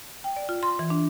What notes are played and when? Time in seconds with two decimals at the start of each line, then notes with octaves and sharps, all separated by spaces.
0.24 G5
0.36 D5
0.49 F4
0.63 C6
0.79 E3
0.90 D4